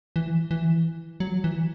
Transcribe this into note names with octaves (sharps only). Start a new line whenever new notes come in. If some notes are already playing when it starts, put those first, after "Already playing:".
E3
E3
F#3
E3